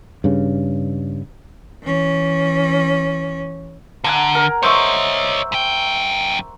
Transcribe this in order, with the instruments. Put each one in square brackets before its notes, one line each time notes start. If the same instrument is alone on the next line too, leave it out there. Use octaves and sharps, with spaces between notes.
[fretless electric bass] G2 C#3
[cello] E3 C#4
[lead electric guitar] D3 [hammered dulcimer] F#5 G#5 A#5
[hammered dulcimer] A#4
[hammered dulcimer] C5 E5 C#6 [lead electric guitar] C#5 D#5
[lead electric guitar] F#2 G5